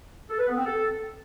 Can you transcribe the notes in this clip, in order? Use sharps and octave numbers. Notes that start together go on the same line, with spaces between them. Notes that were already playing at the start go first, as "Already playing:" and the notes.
A4
B4
B3
C4
A4